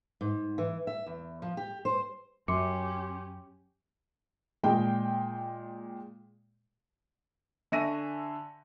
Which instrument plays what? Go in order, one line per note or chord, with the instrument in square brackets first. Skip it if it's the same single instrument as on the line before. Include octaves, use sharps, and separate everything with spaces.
[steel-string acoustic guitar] G#2
E3
E5
E2
F3
G4
C5
[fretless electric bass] F#2 [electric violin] C#4 G4 [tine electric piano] C6 C#7 [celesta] D6
[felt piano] A#2 G#3 G5
D3 E5 G#5 C#6 A#6 D#7